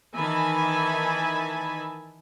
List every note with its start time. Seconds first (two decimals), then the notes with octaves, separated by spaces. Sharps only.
0.15 D#3 E3 E5 G#5 A5 B5